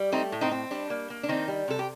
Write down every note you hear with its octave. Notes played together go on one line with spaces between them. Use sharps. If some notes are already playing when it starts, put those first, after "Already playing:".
Already playing: G3
A3 C4 D#4
A2
C4 D#4
C4
G3 D4
A#3
A#3
D4
D#3 C4 D#4
G3
C3 A4
G4